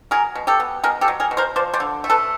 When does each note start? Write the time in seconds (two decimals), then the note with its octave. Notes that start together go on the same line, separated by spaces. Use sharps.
0.11 F#3 G#4 A#4
0.35 B2
0.47 G4 A4
0.60 B3
0.84 B2 G#4 A#4
1.01 G4 A4
1.08 F#3
1.20 G#4 A#4
1.31 B2
1.37 A#4 C5
1.56 F3 C5 D5
1.74 C5 D5
1.80 D3
2.04 A3
2.10 A4 B4